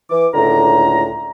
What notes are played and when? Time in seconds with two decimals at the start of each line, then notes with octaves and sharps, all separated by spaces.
0.11 E3 D6
0.34 C#2 A2 D3 A#5